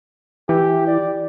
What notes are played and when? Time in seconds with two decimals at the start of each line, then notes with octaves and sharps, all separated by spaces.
0.49 E3 G4
0.87 D5